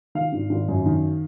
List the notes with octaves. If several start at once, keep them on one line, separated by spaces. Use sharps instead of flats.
D#3 F5
G#1
G#1
F#2
D#3